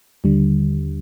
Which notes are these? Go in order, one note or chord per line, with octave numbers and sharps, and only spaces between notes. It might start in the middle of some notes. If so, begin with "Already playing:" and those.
D#2 D3 G3